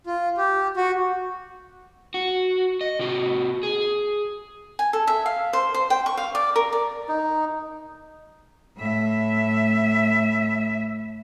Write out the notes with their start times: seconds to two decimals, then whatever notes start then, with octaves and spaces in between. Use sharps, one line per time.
0.06 F4
0.37 G4
0.76 F#4
2.14 F#4
2.81 D#5
2.99 C3 F#4
3.63 G#4
4.79 G#5
4.93 A4
5.07 E5
5.26 F5
5.53 C5
5.74 C5
5.90 G5
6.06 C#6
6.17 F5
6.35 D5
6.56 A#4
6.72 D5
7.09 D#4
8.77 A2 E5